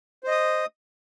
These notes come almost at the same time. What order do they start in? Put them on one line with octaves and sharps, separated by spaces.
C5 D#5 D#6